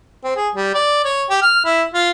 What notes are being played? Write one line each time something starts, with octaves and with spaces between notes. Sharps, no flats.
C4
G#4
G3
D5
C#5
G4
F6
E4
F4